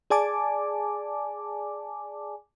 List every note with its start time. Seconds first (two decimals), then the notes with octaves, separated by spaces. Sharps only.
0.10 G#4 D5 G#5 A5 D6